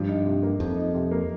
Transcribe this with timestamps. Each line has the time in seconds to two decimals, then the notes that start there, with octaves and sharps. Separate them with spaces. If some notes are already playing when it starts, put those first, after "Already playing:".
Already playing: G2 F3
0.08 D#4
0.25 C3
0.43 A#3
0.60 F2 F3
0.76 D#4
0.94 C3
1.11 A#3